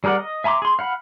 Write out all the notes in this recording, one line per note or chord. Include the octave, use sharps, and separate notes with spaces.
G3 G#4 A#4 D5 F#5
D#5
E5 G#5 A#5 C6 D6
G#4 C6
F5 F#5 B5